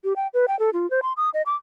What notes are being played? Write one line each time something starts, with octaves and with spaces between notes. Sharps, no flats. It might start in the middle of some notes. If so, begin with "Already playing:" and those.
G4
G5
B4
G5
A4
F4
C5
C6
D#6
D#5
D6